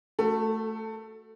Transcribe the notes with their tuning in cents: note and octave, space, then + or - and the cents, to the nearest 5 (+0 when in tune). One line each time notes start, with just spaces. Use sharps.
A3 +0 F#4 +0 A4 +20